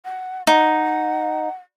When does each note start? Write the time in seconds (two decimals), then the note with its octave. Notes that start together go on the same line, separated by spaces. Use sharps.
0.05 F#5
0.47 D#4 F#5